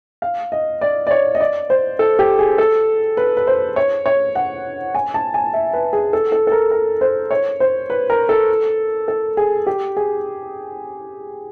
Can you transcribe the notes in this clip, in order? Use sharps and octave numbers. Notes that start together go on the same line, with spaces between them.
F5
D#5
D5
D5
C#5
D#5
D5
C5
A4
G4
G#4
A4
B4
B4
C5
C#5
C#5
F#5
G#5
A5
G#5
E5
B4
G#4
A4
A4
A4
A#4
A#4
C5
C#5
C5
B4
A#4
A4
A4
G#4
G4
G#4